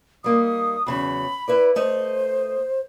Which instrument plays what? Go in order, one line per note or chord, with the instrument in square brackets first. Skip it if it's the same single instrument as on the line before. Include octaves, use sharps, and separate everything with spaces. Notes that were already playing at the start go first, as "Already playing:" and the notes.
[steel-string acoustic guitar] G3 A#3 D#4 [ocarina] D#6
[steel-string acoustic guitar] E2 C#3 F#3 [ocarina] B5
[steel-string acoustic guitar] E4 B4 D5
[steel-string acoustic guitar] A3 D#5 [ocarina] C5